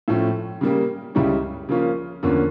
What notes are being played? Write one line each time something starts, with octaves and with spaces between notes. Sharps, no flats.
A2 F3 A3 C#4
C#3 G3 A#3
C#2 C#3 G3 C#4 E4
C#3 F3 A#3 C#4 F4
E2 D3 F3 A#3 C#4